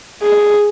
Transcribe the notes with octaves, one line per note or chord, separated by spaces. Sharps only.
G#4